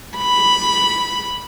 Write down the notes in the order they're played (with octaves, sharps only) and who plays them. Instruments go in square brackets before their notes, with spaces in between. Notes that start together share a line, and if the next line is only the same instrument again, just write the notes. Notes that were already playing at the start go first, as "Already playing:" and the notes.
[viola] B5